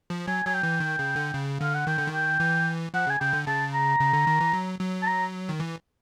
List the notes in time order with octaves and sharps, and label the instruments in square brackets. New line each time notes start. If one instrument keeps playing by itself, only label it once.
[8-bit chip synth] F3
[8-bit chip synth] F#3 [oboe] G#5
[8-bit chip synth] F#3 [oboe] G#5
[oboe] G5
[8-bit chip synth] E3
D#3
C#3
D3
C#3
[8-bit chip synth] D3 [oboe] F5
[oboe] F#5
[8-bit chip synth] D#3 [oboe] G5
[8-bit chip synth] D3
D#3
[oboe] G5
[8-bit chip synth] E3
[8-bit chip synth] F3 [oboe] F#5
[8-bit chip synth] C#3 [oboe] G#5
[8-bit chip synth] C#3 [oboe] G5
[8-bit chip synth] D3
[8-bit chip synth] C#3 [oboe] A5
[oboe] A#5
[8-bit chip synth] C#3
D3
D#3
E3
F#3
F#3
[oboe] A5
A#5
[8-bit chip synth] D#3
E3